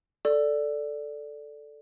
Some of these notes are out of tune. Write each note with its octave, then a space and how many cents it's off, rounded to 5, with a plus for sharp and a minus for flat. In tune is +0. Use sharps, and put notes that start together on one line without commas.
A4 +0 D5 +0